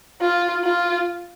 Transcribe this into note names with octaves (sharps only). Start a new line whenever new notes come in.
F4
F4